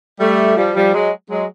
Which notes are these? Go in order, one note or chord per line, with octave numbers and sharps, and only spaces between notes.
G3 A3
F3 G3
F3 G3
F#3 G#3
F#3 G#3